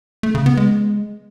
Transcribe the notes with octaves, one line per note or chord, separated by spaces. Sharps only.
A3
C#3
B3
G#3